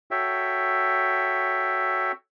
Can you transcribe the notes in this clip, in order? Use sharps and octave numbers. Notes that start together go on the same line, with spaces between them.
F#4 A4 C#5 E5 G5